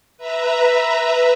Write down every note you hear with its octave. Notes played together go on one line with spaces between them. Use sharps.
B4 E5 A#5